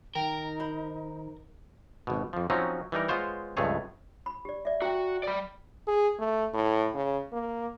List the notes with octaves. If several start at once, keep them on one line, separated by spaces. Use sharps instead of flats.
D#3 D#4 A#4 G5
C5 B5
G#1 B2
F2 F3
F3 F#3 C4 C#4 D#4
E3 G3 D#4 A#4
G#3 B3 F4 C5 C#5
C#2 G2 F3 A3 G#4 C#5
B5
G4 D5
D5 E5
F#4 G5 A#5
D5 B5
G#4
A3
A2
C#3
A#3